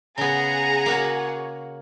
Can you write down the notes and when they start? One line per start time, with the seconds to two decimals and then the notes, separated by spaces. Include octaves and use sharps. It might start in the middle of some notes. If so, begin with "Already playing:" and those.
0.18 C#3 B3 G#4 F#5 A#5
0.86 A#3 F#4 C#5